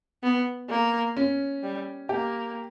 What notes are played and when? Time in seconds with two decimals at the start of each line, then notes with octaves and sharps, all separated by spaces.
0.23 B3
0.69 A#3
1.17 C#4
1.63 G3
2.09 A#3 G4